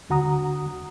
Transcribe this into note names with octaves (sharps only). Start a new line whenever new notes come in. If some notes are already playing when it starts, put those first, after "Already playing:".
D#2 D3 F#4 F#5 A#5 D#6